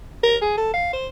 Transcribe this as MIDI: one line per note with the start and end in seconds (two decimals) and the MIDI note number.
0.23 0.37 70
0.42 0.57 68
0.57 0.72 69
0.74 0.90 77
0.93 1.07 72